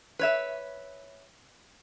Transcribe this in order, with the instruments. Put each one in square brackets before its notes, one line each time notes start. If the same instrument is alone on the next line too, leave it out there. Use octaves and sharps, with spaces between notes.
[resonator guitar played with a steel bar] B4 C#5 E5